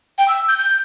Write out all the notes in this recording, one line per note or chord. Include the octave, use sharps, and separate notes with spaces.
G5
E6
G6
G6